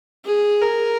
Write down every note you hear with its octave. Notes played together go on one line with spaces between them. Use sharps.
G#4
A#4